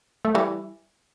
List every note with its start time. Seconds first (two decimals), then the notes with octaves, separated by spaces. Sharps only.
0.25 A3
0.34 E3 G3